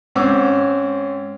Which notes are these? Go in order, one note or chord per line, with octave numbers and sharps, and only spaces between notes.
G#2 C4 C#4 D6 E6